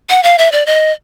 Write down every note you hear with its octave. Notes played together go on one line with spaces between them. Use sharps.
F#5
F5
E5
D5
D#5